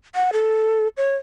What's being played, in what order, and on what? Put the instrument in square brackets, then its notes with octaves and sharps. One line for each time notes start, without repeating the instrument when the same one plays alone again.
[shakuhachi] F#5
A4
C#5